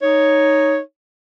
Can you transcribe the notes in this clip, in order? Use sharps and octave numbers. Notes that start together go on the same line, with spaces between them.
D#4 C#5